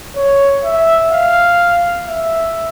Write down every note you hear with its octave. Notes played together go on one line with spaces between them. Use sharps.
C#5
E5
F5
E5